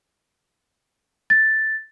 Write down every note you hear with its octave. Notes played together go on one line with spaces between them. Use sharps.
A6